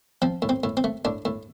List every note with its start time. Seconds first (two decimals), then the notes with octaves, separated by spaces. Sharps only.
0.22 F3 C4
0.42 A2
0.49 C4
0.64 A2
0.77 C4
0.84 A3
1.05 A2 D4
1.25 A2